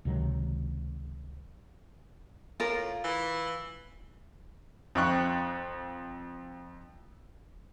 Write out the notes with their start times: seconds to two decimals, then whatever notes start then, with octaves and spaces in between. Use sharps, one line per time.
0.05 C#2 C3 D#3 F#3
2.60 A2 F4 A#4
3.04 E3
4.95 F2 D#4 G5 C#6 F#6